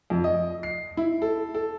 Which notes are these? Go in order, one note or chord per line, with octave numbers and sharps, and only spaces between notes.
F2
D#5
C7
E4
A4
A4